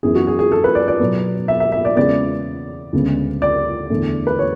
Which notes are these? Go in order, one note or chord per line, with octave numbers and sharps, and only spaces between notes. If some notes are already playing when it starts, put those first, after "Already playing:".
F#2 E3 B3 G#4
F#4
G#4
G#4
A4
B4
D5
D5
B2 F#3 B3
E5
E5
E5
D5
E2 C#3 G#3 B3 D5
D2 C#3 G#3 B3
D5
E2 D3 A3
B4
C#5